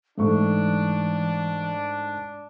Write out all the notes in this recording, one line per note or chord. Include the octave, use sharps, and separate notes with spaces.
G#2 E3 A3 D4 C#6